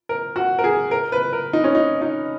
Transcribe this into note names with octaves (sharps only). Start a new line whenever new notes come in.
A#4
F#4
A#4
G#4
A#4
B4
A#4
D#4
C#4
D#4
D#4